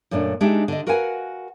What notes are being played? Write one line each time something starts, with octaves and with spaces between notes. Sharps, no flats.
F#2 A#2 A3 C#4 D4
G#3 D4 D#4 G4 E5
D3 D#5
F#4 A#4 B4 F5 F#5 G#5